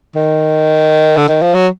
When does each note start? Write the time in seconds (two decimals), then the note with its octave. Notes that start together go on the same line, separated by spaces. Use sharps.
0.15 D#3
1.17 D3
1.28 D#3
1.42 F3
1.54 F#3